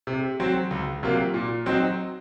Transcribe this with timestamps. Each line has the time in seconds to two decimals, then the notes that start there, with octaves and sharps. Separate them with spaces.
0.07 C3
0.40 F#3 C4
0.71 C#2
1.03 C3 F#3 A#3 F4
1.34 A#2
1.66 F#3 C4 D#4